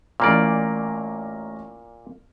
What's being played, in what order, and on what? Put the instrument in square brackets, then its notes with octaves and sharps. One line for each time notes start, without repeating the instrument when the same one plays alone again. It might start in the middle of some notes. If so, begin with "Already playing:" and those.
[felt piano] A1 A#5 F6 [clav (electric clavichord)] A#2 A#3 D5